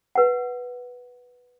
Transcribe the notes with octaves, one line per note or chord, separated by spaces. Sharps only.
B4 F#5